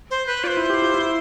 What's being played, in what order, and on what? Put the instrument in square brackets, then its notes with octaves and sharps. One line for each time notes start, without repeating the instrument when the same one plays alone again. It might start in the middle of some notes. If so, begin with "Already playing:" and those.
[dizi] C5
B4
[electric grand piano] F4 [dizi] D5
[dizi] C5
[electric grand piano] E4
G4
F4
E4